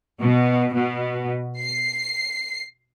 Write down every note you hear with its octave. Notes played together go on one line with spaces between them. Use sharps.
B2
B2
C7